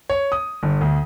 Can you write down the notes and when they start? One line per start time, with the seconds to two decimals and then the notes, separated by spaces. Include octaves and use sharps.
0.10 C#5
0.32 D#6
0.63 G1
0.81 D2